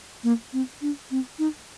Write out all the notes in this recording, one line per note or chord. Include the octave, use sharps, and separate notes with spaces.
A#3
C4
D4
C4
D#4